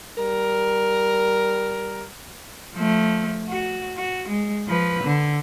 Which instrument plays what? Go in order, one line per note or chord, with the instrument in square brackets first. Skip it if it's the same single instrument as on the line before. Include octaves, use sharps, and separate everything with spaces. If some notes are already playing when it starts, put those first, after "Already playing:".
[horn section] G3 A#4
[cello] F3 A3
F#4
F#4
G#3
F3 B4
D3